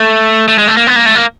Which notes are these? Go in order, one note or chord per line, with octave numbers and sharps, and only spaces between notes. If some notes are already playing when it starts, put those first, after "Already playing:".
Already playing: A3
A3
G#3
A3
A#3
B3
A#3
A3
A#3